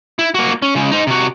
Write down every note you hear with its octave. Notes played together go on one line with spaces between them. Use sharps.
E4
A#3 F#4
C#4
C#3 G#3
D#4 C5
C3 F#4